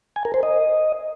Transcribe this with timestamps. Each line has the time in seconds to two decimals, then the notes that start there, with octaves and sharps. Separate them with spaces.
0.16 G#5
0.25 A#4
0.34 C5
0.43 D#5